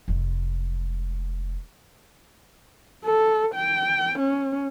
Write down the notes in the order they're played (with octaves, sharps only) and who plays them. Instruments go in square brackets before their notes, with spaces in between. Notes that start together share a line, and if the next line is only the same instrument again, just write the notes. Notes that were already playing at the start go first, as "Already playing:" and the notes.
[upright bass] F1 G#3
[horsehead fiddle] A4
G5
C#4